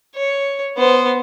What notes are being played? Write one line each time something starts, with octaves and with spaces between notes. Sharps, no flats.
C#5
B3 C5